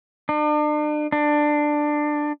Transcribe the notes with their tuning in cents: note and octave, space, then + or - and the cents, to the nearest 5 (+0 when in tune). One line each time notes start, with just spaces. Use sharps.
D4 +40
D4 +15